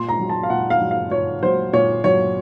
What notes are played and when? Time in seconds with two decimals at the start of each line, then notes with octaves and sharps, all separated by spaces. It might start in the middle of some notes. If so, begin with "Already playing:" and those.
Already playing: A#2 C6
0.09 A#5
0.19 F#3
0.29 A5
0.43 F5
0.50 A#2 F#5
0.70 F5
0.81 F#3
0.91 F5
1.11 A#2 C#5
1.43 F#3 C5
1.73 A#2 C#5
2.04 F#3 C#5